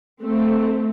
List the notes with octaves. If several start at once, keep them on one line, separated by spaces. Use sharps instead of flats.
A3 C4